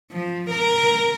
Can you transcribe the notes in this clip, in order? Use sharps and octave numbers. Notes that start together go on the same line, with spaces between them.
F3
A#4